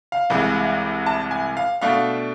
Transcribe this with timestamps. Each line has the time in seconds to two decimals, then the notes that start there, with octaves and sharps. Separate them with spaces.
0.12 F5
0.30 C2 C3 E3 G#3
1.06 A5
1.31 G#5
1.57 F5
1.81 B2 A3 D4 F5